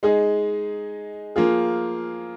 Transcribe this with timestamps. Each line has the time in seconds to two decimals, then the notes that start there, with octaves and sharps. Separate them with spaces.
0.03 G#3 D#4 G#4
1.36 F3 A#3 F4 G#4